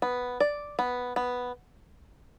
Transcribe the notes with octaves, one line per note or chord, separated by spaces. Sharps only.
B3
D5
B3
B3